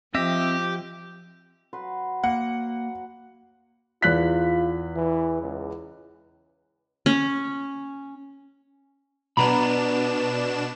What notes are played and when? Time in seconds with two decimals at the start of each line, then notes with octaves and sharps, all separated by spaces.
0.15 F3 C4 G4 D#5 E5
1.73 F#3 B4 C6
2.24 A#3 F#5
4.02 E2 F4 F#6 B6
4.96 E3
5.42 C#2
7.06 C#4
9.37 B2 B3 D4 A#5 B5 E7